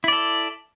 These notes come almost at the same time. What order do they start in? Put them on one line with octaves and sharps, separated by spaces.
E4 D5 A4